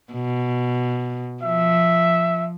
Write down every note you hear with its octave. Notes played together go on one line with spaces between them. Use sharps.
B2
F3 E5